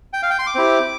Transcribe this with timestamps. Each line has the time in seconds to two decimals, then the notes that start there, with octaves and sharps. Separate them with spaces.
0.13 G5
0.23 F5
0.30 G5
0.39 C6
0.47 D6
0.55 C4 E4 G4